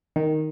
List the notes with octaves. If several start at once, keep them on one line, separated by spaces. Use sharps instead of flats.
D#3